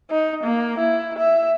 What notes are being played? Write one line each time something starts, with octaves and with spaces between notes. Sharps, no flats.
D#4
A#3
E4
E5